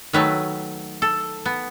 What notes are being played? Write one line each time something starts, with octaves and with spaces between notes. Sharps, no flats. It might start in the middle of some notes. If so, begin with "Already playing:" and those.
D#3 F#3 A3 B4
A4
B3